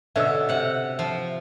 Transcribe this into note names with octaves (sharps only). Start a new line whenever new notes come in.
B2 D3 C#4 E5 E6
C3 F#5
F3